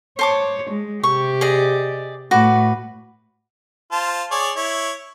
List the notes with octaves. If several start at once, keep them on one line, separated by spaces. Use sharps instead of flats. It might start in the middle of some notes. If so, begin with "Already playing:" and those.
C5 C#5 A5 D6
G#3
C3 G4 C#6
G#4 D5 D#5
A2 A3 F#4 B4 D6
F4 C5 A5
G#4 C#5 D5
E4 C#5